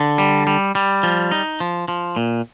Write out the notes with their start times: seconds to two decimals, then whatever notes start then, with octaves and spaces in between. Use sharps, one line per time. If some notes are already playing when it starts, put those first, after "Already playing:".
Already playing: D3
0.18 G3
0.47 G3
0.75 G3
1.03 F3
1.32 D#4
1.60 F3
1.88 F3
2.16 A#2